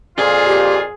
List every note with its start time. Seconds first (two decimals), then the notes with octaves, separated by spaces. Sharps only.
0.18 F2 A#2 F4 G#4
0.46 G4